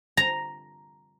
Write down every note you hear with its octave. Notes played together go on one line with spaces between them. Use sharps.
A#5